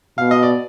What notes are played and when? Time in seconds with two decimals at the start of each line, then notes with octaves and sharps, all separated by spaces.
0.18 B2 F5
0.31 D#5
0.43 D5